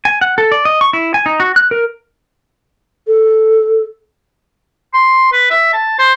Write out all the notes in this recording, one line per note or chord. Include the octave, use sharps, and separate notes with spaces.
G#5
F#5
A4
D5
D#5
C#6
E4
G#5
D#4
F#4
F#6
A#4
A4
C6
B4
E5
A5
C5